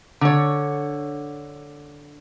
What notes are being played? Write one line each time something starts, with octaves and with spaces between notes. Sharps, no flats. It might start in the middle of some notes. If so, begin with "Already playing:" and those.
D3 C#5